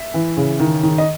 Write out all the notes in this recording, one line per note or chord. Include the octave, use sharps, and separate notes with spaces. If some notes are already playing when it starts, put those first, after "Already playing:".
Already playing: E5
E3
C#3
D#3
D#3
D#5